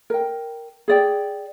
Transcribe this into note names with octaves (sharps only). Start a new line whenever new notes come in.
A#4 G5
G#4 D5 G5